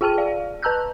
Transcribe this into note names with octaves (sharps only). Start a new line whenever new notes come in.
F4 G#4 G5 A5 F6 D#7
D5 F5
B4 A5 A#5 E6 F#6 G6